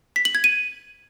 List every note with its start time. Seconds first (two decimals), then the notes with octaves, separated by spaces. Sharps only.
0.16 B6
0.25 F#7
0.35 G#6
0.44 D#7